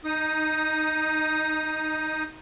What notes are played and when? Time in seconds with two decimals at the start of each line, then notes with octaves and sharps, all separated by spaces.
0.04 D#4 D#6